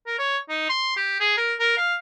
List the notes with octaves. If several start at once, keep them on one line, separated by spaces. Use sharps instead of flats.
A#4
C#5
D#4
C6
G4
G#4
A#4
A#4
F5